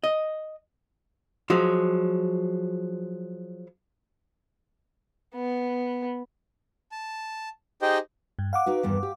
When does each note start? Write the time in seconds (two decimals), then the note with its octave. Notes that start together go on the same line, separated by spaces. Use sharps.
0.04 D#5
1.50 F3 F#3 G#3
5.35 B3
6.92 A5
7.82 D#4 G4 G#4 C5 D#5 G5
8.39 G2
8.53 F5 F#5 D6
8.66 D#4 F#4 B4
8.83 E2 G2 D#3
9.03 G4